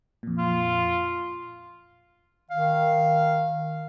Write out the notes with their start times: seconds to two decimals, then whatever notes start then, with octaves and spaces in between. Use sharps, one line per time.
0.23 F2 A#2
0.38 F4
2.50 D#3 F5